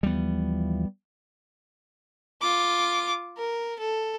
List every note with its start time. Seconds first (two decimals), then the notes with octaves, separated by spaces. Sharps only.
0.03 D#2 E3 F3 G3 B3
2.42 F4 D6
3.38 A#4
3.79 A4